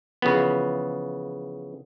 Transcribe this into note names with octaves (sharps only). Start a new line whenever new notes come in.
C#3 E3 F3 B3